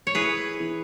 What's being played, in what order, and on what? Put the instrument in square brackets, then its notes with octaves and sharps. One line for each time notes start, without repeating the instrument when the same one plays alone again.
[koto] C#5
[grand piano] E4 [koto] G#4 B4
[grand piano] E3